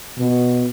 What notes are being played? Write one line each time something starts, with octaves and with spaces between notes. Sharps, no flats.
B2